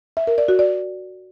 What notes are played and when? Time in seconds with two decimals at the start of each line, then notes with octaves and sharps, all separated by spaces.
0.17 E5
0.27 A#4
0.38 D5
0.48 F#4
0.59 D5